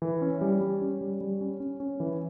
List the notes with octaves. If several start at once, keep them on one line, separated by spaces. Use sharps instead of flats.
E3
C#4
G3
G3
C#4
G3
G3
C#4
C#4
C#4
E3